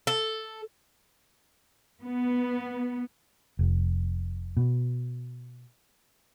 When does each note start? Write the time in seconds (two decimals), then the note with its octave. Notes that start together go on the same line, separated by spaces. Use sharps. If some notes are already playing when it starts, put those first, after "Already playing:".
0.07 A4
2.02 B3
3.59 F1
4.57 B2